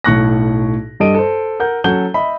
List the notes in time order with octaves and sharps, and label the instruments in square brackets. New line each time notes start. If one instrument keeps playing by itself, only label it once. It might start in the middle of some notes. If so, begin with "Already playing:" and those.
[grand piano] B1 A2 C#6 F#6 A#6
G2 G3 A4 D#5 D7 D#7
A4 C5
A#4 F#5 G6
F#3 C#4 A4 F#5 G6 G7
D#5 E5 B5